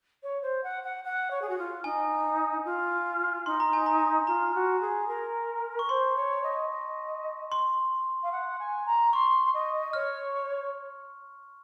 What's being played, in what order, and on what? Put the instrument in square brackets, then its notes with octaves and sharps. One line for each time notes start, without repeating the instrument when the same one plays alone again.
[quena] C#5
C5
F#5
F#5
F#5
C#5
G#4
F#4
F4
[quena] D#4 [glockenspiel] G#5
[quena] F4
[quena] D#4 [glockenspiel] C6
[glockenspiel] A#5
G#5
A#5
[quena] F4 [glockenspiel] A#5
[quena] F#4
G#4
A#4
[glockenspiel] C#6
[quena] C5 [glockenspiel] C6
[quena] C#5
D#5
D#5
[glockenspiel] C6
[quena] F5
F#5
G#5
A#5
[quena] C6 [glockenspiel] C#6
[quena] D#5
[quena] C#5 [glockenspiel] F6